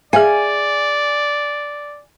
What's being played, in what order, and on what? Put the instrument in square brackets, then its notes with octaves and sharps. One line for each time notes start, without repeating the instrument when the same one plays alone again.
[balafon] G#4 E5 F5 [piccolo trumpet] D5 [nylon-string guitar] G#5